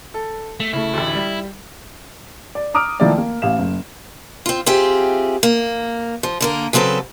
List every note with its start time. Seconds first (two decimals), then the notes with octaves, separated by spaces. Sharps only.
0.14 A4
0.60 A3
0.73 C#3 A3 E4
0.93 A1 D2
1.15 G3
2.55 D5
2.74 A#5 D6 D#6 F6 D7
3.00 D#3 F3 A3 A#3 E4 D5
3.18 A#3
3.42 A1 F5 E7
3.58 F#1
4.46 C4 F4
4.66 C4 F4 G4 G#4 E5
5.43 A#3
6.23 F3
6.41 D3 A#3 A#4
6.73 C#3 F#3 C4 A4 B4